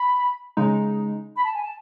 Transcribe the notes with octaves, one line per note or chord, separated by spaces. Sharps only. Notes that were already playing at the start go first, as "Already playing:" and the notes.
Already playing: B5
C#3 G#3 D#4
B5
A5
G#5
A5